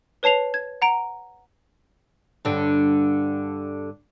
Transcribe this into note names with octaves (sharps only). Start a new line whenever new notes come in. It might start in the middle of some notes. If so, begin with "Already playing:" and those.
B4 C#5 A5 C7 F7
G#6
F#5 A#5 D7
G2 D3